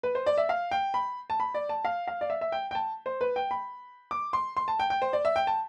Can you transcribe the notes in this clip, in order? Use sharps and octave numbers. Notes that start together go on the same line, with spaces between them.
B4
C5
D5
E5
F5
G5
B5
A5
B5
D5
A5
F5
F5
D5
E5
E5
G5
G5
A5
C5
B4
G5
B5
D6
C6
C6
A5
G5
G5
C5
D5
E5
G5
A5